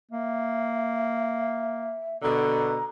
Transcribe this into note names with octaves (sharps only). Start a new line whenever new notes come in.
A#3 E5
B2 D3 A#5